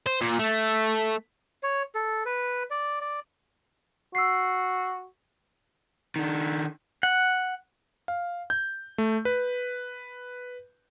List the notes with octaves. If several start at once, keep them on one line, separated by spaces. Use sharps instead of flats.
C5
A#2
A3
C#5
A4
B4
D5
D5
F#4 E6 C7
D#3 D4
F#5
F5
G6
A3
B4